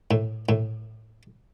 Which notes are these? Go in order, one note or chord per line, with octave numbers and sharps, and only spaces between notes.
A2
A2